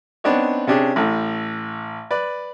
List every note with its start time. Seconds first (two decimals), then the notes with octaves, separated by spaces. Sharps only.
0.24 B3 C4 D4 D#4 C#5
0.67 C3 C#4 D4 G4 G#4
0.96 A1 A2
2.11 B4 D5